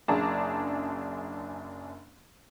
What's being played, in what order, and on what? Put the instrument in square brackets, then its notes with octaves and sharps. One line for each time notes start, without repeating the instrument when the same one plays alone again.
[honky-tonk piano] F#1 F#2 D4 G#4 A5 A#5